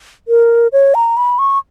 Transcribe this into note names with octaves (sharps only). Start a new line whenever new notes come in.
A#4
C#5
A#5
B5
C#6